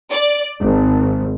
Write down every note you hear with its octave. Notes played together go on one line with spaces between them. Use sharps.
D5
G#1